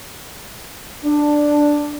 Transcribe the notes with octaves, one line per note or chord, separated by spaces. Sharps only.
D4